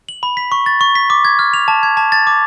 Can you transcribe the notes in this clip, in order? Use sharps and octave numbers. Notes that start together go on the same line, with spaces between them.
F#7
B5
B6
C#6
A6
C#6
B6
D6
G#6
F6
F7
A5
G#6
A5
A6
D6